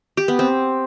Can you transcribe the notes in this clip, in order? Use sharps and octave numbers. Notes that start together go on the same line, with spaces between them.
G4
B3
C4